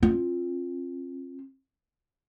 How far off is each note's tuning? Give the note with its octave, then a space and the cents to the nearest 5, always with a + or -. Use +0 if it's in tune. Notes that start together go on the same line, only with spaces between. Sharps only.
C4 +45 F4 +0